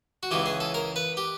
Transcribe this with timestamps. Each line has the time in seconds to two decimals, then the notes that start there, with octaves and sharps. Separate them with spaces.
0.23 F#4
0.31 C#2 C#3 E3 G4
0.46 G#4
0.60 A4
0.74 A#4
0.96 B4
1.17 G4